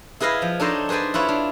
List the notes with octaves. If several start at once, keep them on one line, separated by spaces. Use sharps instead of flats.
E4 G#4 B4 D#5 F5
F3
D4 D#4 A4 C5 C#5 D#5
G#4 B4 C5 D5 G#5
E4 F4 B4 C#5
D4